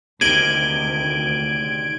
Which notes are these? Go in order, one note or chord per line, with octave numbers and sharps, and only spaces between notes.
D2 C3 D#3 G#6 D7 D#7 F#7 G7